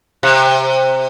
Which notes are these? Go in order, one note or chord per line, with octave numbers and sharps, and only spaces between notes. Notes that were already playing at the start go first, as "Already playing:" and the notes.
C3